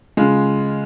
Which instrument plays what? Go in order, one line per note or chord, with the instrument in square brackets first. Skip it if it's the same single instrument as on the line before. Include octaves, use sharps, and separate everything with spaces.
[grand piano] C#3 G#3 F4